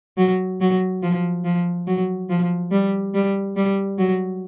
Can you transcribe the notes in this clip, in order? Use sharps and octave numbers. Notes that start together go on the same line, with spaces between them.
F#3
F#3
F3
F3
F#3
F3
G3
G3
G3
F#3